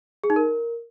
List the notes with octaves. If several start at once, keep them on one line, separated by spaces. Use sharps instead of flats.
G#4
D#4
A#4